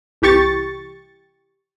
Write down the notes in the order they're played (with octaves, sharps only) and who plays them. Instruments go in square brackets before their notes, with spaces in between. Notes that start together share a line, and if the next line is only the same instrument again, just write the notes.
[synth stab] C2 E3 G4 C#6 A6